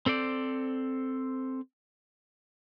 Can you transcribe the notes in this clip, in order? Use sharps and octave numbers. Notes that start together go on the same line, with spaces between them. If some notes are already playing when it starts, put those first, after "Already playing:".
C4 A4 C5 D5